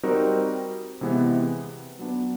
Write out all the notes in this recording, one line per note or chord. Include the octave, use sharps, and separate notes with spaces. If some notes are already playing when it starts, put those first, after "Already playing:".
G3 C4 D#4 F#4 A#4
C3 E3 G#3 B3
F#3 B3 D4